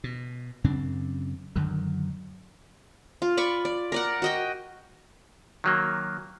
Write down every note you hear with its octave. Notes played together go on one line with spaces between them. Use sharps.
B2
F#2 C#3 C4 D4
F#2 D3 D#3 F#3
F4
D5 B5 C#6
D5
A#4 D5 F#5
F#4 D#5 G5
D#3 F#3 A#3